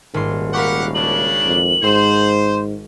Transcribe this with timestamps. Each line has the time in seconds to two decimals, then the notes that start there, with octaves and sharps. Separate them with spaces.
0.14 D#1 G#1 C6
0.54 G4 A#4 F5 F#5 B5 C#6
0.95 C#3 D4 F#7
1.45 F2
1.83 G#2 C5